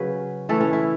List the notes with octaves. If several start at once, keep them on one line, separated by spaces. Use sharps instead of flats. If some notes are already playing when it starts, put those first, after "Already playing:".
Already playing: C#3 F#3 C#4 B4
E3 A3 C#4 A4
C#4
E4